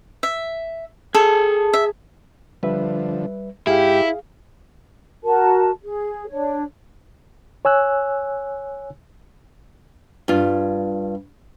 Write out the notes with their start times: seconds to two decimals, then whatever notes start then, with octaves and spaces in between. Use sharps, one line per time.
0.23 E5
1.15 G#4 A4 A5
1.73 E5
2.63 D3 F3 G3 B4 E5
3.67 G#2 E4 G4 G#4 F5
5.23 F#4 A#4 A5
5.82 G#4
6.28 D4 C#5
7.65 C#5 G#5 E6 F#6
10.28 G2 F4